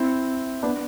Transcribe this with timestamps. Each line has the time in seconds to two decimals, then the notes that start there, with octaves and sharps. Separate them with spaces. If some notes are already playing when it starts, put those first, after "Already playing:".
Already playing: C4 E4
0.63 B3 D4